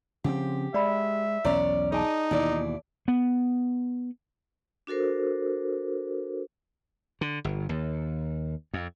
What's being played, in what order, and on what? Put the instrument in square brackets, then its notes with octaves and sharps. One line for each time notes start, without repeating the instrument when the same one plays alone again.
[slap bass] C#3 F3 C4 [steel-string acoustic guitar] G4 [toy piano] F#5
[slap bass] G#3 [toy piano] D5 B5 [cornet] E5
[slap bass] B1 E2 [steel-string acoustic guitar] C#4 D5 [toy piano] C#5 A#5 C#6
[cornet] D#4 [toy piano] G#4 G#5 A5 [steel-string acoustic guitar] D#5
[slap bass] D#2 B2 E3 [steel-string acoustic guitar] E4 D5
[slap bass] B3
[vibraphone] D4 F#4 A4 A#4 C5
[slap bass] D3
G1
D#2
F2